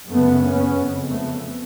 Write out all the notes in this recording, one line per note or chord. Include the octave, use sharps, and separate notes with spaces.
F#2 C#3 A3 B3
B3 C#4
F2 C#3
A3 B3